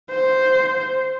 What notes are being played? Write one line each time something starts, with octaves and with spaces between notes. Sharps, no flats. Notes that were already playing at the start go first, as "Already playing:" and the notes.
C5